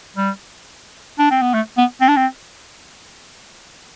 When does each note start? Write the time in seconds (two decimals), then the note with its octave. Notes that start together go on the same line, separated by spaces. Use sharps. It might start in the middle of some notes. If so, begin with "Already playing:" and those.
0.16 G3
1.19 D4
1.31 C4
1.42 B3
1.54 A3
1.78 B3
2.01 C4
2.08 D4
2.17 C4